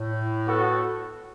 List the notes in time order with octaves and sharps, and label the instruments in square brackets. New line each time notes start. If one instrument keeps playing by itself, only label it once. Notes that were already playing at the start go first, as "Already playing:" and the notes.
Already playing: [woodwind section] A2
[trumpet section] B3 F#4 A4